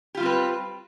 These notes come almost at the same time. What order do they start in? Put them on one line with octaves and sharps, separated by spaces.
G4 F4 G3 C4 B4